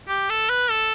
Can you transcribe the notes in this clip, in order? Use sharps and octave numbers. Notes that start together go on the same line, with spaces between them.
G4
A4
B4
A4